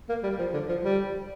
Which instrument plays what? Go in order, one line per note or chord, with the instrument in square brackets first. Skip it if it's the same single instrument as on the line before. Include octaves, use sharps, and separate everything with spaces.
[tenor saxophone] A#3
G3
F3
D3
F3
G3